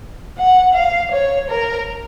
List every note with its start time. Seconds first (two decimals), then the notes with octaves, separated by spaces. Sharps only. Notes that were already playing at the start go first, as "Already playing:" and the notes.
0.38 F#5
0.74 F5
1.12 C#5
1.50 A#4